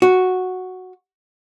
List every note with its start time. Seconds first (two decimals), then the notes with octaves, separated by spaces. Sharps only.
0.02 F#4